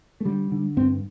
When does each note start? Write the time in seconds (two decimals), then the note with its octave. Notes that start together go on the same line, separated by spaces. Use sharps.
0.20 A3
0.25 D3 G3
0.52 D3
0.77 G2 C4